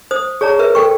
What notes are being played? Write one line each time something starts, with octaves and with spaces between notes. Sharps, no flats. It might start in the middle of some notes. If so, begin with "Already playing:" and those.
C5 D#6
G#4 C#5 D5 A5 A#5
A#4 B4 E5
A4 G5 C#6